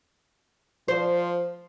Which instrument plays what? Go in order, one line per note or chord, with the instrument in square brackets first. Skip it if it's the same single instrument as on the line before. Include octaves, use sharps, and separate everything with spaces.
[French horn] F3 [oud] C5